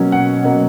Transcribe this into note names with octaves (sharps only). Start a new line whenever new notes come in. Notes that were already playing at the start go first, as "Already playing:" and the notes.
Already playing: B2 F#3 A#3 C#4
F#5
B2 F#3 A#3 C#4